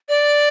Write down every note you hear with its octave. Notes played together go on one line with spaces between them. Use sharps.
D5